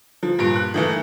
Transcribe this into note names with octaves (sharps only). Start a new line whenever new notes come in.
F3
G2 A#2 D7
F#6
D#3 E3 A3